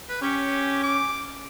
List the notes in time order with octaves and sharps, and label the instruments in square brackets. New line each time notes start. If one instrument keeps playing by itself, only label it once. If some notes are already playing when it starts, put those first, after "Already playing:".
[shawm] B4
[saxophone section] C#4 [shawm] G4
[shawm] D6